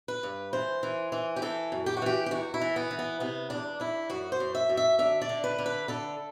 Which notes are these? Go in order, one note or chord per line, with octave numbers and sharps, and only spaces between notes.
B4
G2
E3 C5
E3
E3
G4
E3 A4
F#2
G4
F#4
E3 G4
G4
E2 F#4
E4
E3
B3
E3
B3
C3 B3
E2 D4
E2 E4
F#2 F#4
C5
F#2
E5
F#2
E5
D3 E5
D5
D3
B4
D3
B4
D3 A4